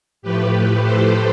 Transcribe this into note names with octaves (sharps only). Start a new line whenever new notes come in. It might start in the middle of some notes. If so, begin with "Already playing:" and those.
A2 F3 A3 G4 B4
A4 C5